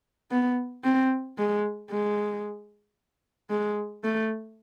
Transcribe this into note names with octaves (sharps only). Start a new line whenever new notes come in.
B3
C4
G#3
G#3
G#3
A3